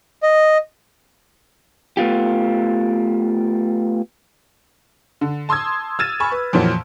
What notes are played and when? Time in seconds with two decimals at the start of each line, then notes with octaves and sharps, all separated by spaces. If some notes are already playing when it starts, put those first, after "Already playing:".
0.23 D#5
1.97 A3 B3 F4 G4
5.21 D3
5.49 A5 C6 D#6 E6 G#6
5.99 E6 F6 G#6 A6 D#7 E7
6.20 G#5 B5 C#6
6.32 B4
6.53 F2 A#2 E3 F#3